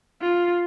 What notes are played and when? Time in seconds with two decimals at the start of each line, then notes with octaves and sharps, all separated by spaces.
0.21 F4